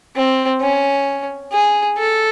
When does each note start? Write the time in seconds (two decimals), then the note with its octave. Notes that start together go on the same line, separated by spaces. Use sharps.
0.16 C4
0.61 C#4
1.52 G#4
1.98 A4